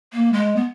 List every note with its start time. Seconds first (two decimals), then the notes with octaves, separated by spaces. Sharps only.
0.13 A#3
0.33 G#3
0.56 B3